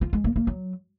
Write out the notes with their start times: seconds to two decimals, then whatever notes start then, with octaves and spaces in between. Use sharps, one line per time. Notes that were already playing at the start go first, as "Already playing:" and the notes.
0.01 F4
0.13 G#3
0.24 A#3
0.36 A#3
0.47 F#3